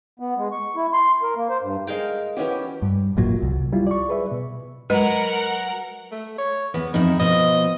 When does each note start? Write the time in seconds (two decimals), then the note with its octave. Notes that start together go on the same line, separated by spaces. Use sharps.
0.19 B3
0.37 G#3
0.52 C#6
0.76 E4
0.93 C6
1.23 A#4
1.36 A#3
1.50 C5
1.62 G2
1.87 G#3 A#4 F5 G5
2.37 E3 F#3 C#4 G4
2.82 G2
3.17 D1 G1 A#2 F#3
3.42 C2
3.72 F#3 G3 E4 F4
3.87 D5 C#6
4.09 G#4 B4 E5
4.31 B2
4.90 F#3 G#3 A#4 B4 D#5 F#5
6.12 A3
6.38 C#5
6.74 E2 B3
6.94 F2 D#4 E4
7.20 B2 F3 D#5